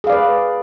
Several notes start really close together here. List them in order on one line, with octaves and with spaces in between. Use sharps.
G#4 F5 D5 B4